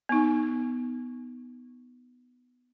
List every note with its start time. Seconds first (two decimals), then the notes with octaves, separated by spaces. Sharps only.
0.09 B3 D#4